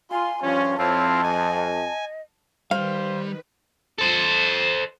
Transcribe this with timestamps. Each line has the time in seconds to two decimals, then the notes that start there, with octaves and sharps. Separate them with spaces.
0.11 F4 G#5 C6
0.43 G2 F3 C#4 F4
0.78 F2 C4 E4 F4 C#5 A5
1.23 D#5 G#5
2.71 D#3 G3 B4 C5 F5
3.98 A4 C5